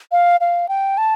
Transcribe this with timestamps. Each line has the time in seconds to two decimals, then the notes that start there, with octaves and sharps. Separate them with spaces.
0.12 F5
0.41 F5
0.69 G5
0.98 A5